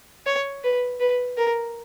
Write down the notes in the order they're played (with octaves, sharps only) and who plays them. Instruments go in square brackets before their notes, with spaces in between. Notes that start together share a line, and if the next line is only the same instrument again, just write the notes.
[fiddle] C#5
B4
B4
A#4